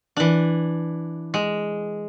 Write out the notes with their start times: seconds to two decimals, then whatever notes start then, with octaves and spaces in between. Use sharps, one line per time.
0.17 E3 D4
1.34 G#3